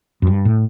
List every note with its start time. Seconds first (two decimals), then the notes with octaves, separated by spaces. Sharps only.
0.22 F#2
0.27 G2
0.45 A2